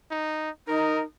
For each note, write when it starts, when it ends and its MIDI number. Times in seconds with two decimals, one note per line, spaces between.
0.11 0.50 63
0.68 1.00 63
0.68 1.04 70